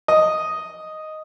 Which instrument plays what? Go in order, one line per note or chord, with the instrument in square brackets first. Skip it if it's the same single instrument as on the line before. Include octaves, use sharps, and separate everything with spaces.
[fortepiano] D#5